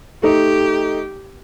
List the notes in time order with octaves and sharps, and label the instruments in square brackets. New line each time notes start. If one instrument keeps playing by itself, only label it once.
[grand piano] A3 D#4 [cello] G4